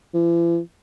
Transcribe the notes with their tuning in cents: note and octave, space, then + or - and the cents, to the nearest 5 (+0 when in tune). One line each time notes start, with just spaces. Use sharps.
E3 +45